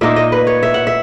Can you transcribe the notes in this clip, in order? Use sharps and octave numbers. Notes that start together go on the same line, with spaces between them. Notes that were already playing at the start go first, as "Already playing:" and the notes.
A#2 A#3 D#4 E5
D#5
B4
C#5
E5
F#5
E5